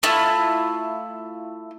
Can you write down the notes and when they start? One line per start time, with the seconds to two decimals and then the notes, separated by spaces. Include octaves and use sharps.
0.03 A3 E4 F4